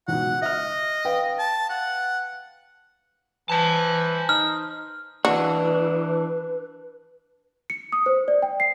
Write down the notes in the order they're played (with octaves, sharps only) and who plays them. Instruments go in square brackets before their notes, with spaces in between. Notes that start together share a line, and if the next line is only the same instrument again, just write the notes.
[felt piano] C#2 B2 [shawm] F#5
[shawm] D#5 [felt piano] E5 F6
[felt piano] B4 F5 G5
[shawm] A5
F#5
[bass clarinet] E3 [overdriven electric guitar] C5 A5
[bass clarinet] D#4 [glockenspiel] F6
[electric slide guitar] E3 D4 [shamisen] F#4 [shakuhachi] B4
[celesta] C#7
D#6
C5
D5
G5
C7